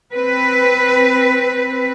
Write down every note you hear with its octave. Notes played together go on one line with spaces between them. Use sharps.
C4 B4